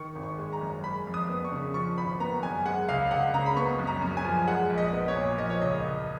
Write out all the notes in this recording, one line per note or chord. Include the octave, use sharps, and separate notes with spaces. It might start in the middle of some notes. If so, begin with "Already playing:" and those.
Already playing: D#3 C#6
G#1
C#6
G#3
A#5
F#2
G#3 B5
F2
D#6
B3
C#6
C#3
F3 C#6
G#1 B5
B3 A#5
F#2 G#5
G#3 F#5
C#2 F5
C#2 F#5
C#3 A#5
B5
B3 C#6
F#2
A#5
F#2
G#5
F3
G#3 F#5
A#1
D#5
B3
C#5
A#2
F3 D#5
C#5
C#2 D#5
C#2